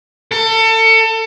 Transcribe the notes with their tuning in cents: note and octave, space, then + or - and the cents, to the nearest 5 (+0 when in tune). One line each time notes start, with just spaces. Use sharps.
A4 +30